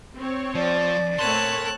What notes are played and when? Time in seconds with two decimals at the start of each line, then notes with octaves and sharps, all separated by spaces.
0.15 C4 C#5
0.55 F3 D5
1.19 A3 C4 A#4 C#5 A5 C6 F#6